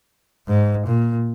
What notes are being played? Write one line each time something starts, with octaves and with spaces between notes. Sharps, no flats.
G#2
A#2